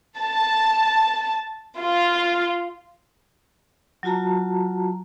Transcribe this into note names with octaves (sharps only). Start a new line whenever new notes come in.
A5
F4
F#3 F4 F#4 A5 A#5